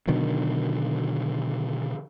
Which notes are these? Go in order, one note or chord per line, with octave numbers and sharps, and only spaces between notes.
B2 D3 D#3 F#3